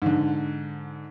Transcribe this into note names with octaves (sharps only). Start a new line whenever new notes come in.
G#2 D3